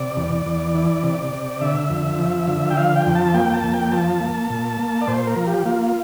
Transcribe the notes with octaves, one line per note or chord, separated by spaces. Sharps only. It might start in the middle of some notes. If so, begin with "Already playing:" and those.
Already playing: C3 D5
E2
E2
E3
C3
C3
D3 E5
F2
F3
D3
G5
F3 F5
G5
F2
A5
A#3 G5
A5
F2
G5
F3 A5
A#3
A#2
A#3
D5
A#2 C5
A#4
F3
G4
A#3 F4